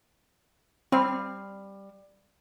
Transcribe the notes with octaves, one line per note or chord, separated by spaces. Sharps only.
G3 C4 F5